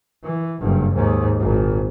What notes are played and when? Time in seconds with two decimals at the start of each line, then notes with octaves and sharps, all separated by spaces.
0.24 E3
0.60 F#1 G2
0.94 D#2 G#2
1.40 G#1 A#2